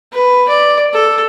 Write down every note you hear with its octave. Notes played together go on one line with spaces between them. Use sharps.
B4
D5
A4